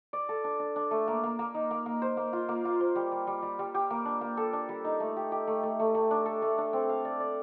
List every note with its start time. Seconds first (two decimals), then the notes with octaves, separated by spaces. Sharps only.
0.13 D5
0.29 A4
0.44 D4
0.59 D4
0.76 D4
0.91 A3
1.08 A#3
1.23 A#3
1.39 A#3
1.54 D#4
1.71 A#3
1.86 A#3
2.02 C5
2.17 A#3
2.33 F4
2.49 A#3
2.65 F4
2.80 C5
2.96 G3
3.12 G3
3.27 G3
3.42 G3
3.59 G3
3.75 G4
3.90 A#3
4.05 D4
4.21 A#3
4.37 A4
4.53 D4
4.69 G3
4.85 D#4
5.00 A3
5.16 G4
5.32 G4
5.47 A3
5.63 A3
5.79 A3
5.95 A3
6.11 D4
6.26 A4
6.42 A3
6.58 D4
6.73 C4
6.89 F5
7.05 D5
7.20 D5